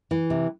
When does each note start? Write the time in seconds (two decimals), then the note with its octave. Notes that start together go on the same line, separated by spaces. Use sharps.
0.11 E3
0.30 C3